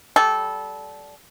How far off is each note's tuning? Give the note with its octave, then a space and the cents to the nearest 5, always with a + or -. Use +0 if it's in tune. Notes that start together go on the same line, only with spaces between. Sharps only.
G3 -15 A4 -20